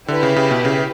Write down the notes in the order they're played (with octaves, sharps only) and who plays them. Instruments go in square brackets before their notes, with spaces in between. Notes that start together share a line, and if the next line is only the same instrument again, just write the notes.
[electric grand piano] D3 [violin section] E4 G4 B4
[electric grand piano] C#3
C#3
B2
C#3